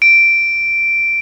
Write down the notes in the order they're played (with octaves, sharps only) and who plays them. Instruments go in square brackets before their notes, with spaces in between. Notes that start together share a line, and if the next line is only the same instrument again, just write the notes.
[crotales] D7